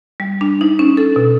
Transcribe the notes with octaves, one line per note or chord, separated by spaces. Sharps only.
G3
D4
D#4
C#4
A4
B2